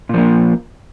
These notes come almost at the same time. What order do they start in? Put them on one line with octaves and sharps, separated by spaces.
A#2 F3 A#3